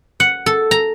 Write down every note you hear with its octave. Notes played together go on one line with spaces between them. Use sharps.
F#5
A4
A#5